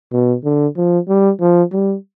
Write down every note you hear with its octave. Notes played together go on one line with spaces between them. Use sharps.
B2
D3
F3
G3
F3
G3